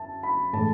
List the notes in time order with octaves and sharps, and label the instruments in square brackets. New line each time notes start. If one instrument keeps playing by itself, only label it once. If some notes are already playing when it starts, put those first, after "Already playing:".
Already playing: [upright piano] F#2 E5 A5
B5
A2 E3 G#3 A5